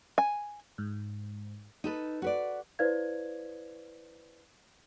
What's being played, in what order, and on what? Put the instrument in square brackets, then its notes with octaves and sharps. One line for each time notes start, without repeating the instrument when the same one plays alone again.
[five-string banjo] G#5
[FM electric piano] G#2
[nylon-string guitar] D#4 A4 B4
F#4 B4 D5
[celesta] E4 B4 C5 D5 F5 G#6